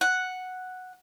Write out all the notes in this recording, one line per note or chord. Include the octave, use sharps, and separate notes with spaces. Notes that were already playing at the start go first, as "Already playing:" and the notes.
F#5